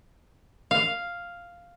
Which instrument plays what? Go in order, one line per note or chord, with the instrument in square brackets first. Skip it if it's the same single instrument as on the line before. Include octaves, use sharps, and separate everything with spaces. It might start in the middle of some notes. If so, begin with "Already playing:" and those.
[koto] F5